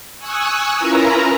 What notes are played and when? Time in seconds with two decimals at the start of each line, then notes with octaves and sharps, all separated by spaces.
0.19 G#5 C#6 D#6 E6 F#6
0.77 C#4 E4 F4 A#4 B4 A#5